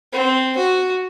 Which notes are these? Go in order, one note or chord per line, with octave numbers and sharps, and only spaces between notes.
C4
F#4